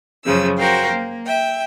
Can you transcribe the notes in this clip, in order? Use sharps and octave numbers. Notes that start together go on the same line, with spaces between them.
F#2 C#3 F3 E6
F#4 A#4 C5 F5 G5
A#3
E5 G5